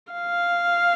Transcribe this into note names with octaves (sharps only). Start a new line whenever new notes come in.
F5